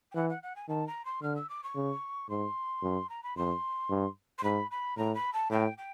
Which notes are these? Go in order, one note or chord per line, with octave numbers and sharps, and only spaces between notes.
G5
E3 F#5
F#5
F#5
G#5
D#3 A5
A#5
C6
D3 F6
E6
D6
C#6
C#3
G#2 C6
F#2
A#5
B5
F2 C6
G2
C6
G#2 B5
B5
A2 A#5
B5
A5
A2 G5
G5